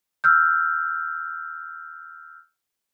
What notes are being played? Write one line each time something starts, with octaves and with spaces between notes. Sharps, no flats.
E6 F6 G6